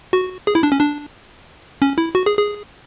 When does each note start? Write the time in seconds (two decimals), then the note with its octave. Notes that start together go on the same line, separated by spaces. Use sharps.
0.13 F#4
0.47 G#4
0.55 E4
0.63 D4
0.72 C#4
0.80 D4
1.82 C#4
1.98 E4
2.15 F#4
2.26 G#4
2.37 G#4